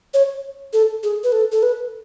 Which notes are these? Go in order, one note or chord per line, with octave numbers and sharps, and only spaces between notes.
C#5
A4
G#4
B4
A4
A4
B4